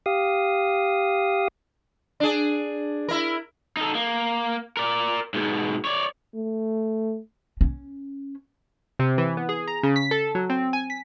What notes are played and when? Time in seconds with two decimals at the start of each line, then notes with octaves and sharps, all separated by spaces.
0.06 G4 F5 D#6
2.20 D4 G#4
3.09 E4 A#4
3.77 D#4 A4
3.95 A#3
4.77 A#4 D5
5.34 G#2 B2
5.85 C#5 D5
6.35 A3
7.61 C#4
8.99 C3
9.18 E3
9.37 B3
9.49 G#4
9.68 A#5
9.83 C#3
9.96 B6
10.11 A4
10.35 F#3
10.50 C4
10.73 G#5
10.90 B6